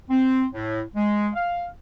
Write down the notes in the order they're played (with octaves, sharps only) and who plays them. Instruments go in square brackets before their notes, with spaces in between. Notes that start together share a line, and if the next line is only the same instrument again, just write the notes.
[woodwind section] C4
A2
G#3
F5